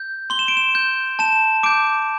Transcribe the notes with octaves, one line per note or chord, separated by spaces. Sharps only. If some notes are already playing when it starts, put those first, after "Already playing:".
Already playing: G6
C6 G7
E7
D7
E7
G6
A5 E7
D6 G6 D7